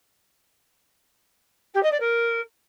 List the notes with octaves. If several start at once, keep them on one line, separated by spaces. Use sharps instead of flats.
G4
D#5
D5
A#4